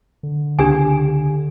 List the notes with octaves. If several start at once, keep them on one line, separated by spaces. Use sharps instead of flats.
D3
C#2 D4 G4 G#5